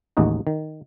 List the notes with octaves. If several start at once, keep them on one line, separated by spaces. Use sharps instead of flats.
A1 D#2 G#3 D#4 F#4
D#3